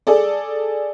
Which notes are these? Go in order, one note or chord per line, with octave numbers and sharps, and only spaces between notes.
G#4 A4 D5